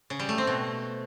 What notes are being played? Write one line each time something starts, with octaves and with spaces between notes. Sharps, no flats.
C#3
G3
A3
C4
B2